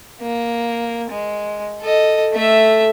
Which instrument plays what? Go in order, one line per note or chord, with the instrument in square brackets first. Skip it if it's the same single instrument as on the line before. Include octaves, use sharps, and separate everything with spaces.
[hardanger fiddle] A#3
G#3
A4 D#5
A3 E5